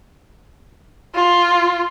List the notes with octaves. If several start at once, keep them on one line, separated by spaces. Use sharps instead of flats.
F4